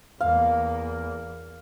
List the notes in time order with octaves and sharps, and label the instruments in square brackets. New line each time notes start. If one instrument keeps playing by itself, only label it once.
[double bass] E2 A#3 [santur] F5